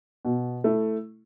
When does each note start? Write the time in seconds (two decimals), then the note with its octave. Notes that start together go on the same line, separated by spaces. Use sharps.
0.25 B2
0.64 A3 E4